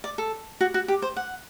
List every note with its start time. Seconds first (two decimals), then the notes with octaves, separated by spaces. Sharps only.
0.04 D5
0.18 A4
0.61 F#4
0.74 F#4
0.88 G4
1.02 C5
1.17 F#5